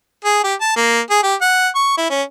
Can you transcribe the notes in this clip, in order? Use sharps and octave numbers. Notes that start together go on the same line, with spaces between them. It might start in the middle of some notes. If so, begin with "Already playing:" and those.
G#4
G4
A5
A#3
G#4
G4
F#5
C#6
E4
C#4